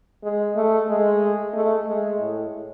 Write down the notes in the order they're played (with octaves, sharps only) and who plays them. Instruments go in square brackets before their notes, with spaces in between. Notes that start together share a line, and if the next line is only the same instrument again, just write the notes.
[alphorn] G#3
A3
G#3
A3
G#3
A2